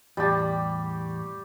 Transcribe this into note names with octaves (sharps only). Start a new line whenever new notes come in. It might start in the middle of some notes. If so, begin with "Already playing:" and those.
E2 A2 G3 G4 A5